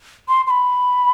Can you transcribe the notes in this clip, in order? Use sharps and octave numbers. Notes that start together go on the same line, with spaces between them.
C6
C6
B5